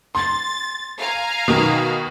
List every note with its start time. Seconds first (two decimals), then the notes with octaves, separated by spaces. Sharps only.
0.15 C6 A6
0.99 F5 G#5 A#5
1.48 B2 D#3